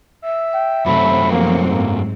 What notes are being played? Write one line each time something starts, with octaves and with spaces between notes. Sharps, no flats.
E5
G5
F#2 C3 F#3 A3 C4 B5
F3 A#3
G#2 A#3